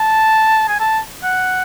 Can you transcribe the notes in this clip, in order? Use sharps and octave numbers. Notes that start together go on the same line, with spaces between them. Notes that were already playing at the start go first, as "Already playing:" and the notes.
Already playing: A5
G#5
A5
F#5